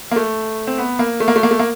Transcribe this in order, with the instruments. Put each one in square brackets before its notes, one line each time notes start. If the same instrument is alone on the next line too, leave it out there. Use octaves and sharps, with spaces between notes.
[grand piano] A#3
A3
C4
B3
A#3
A3
A#3
A3
A#3
A3
A#3